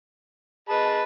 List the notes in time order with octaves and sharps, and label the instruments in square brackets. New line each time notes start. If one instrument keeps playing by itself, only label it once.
[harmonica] G#4 D#5 A5 [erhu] B4